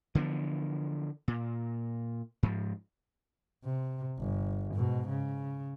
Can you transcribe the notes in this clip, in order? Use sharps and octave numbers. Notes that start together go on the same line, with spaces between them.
D3 E3 F3 B3
A#2
G#2 F3
C3
G1
G#2 B2
C#3